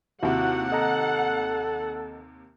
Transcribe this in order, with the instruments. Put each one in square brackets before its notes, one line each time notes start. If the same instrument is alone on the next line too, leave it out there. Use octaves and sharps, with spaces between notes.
[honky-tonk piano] D#2 C3 [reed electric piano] E4 [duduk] F#4 [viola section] F#5
[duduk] A4 [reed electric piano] D#5 A#5